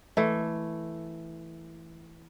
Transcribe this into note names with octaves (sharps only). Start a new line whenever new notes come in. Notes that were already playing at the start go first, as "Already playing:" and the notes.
E3 A3